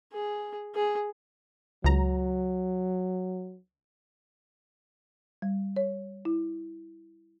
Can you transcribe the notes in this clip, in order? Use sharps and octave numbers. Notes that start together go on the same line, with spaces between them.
G#4
G#4
C#2 F#3 A#5
G3
C#5
E4